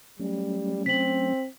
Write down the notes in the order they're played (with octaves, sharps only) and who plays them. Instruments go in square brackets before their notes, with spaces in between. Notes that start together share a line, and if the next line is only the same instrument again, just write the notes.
[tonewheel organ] F#3 A3 C#4 [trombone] G3
[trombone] C4 [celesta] B6 F#7